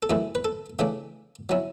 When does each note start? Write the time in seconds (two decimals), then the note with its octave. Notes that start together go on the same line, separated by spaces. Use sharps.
0.03 A4
0.10 F#2 E3 A3 E4 G#4
0.35 B4
0.45 A4
0.79 C#3 E3 A3 D4 E5
1.49 F#3 C#4 E4